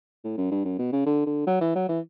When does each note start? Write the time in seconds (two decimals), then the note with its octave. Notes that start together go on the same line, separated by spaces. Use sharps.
0.24 A2
0.38 F#2
0.51 G2
0.65 F#2
0.79 B2
0.92 C#3
1.06 D3
1.26 D3
1.47 F#3
1.61 E3
1.75 F#3
1.89 E3